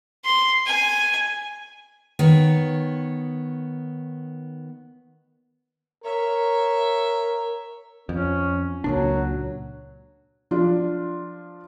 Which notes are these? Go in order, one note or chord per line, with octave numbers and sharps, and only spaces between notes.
C6
G#5
D#3 B3 C#5
A#4 C#5 E5
F2 C#4
C#2 A#2 F#3 D4
F3 D4 F4